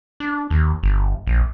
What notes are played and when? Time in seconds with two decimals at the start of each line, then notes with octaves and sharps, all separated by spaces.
0.20 D4
0.50 D#2
0.83 G1
1.27 A#1